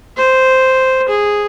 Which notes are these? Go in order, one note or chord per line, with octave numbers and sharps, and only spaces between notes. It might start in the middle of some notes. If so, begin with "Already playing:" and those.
C5
G#4